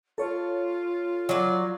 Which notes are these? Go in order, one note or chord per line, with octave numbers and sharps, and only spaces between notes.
F4 A4 C#5
F#3 D5